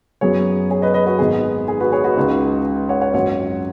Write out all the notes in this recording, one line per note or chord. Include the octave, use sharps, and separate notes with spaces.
F#2 F#3 B3 G#4 C#5
G#4 C#5
B4 D#5
B4 D#5
F#4 B4
G#1 G#2 D#3 B3 G#4
G#4
F#4 B4
G#4 C#5
F#4 B4
C#2 C#3 G#3 D#4
C#5 F#5
C#5 F#5
G#1 F#2 F#3 C#5 F#5